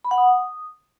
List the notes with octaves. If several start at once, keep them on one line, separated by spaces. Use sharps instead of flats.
B5
F#5
D#6